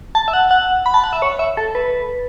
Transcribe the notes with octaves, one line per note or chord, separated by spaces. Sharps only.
A5
E5
F#5
F#5
B5
A5
F#5
E5
C#5
E5
A4
B4